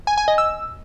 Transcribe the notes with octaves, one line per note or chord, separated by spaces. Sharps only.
G#5
G#5
D#5
E6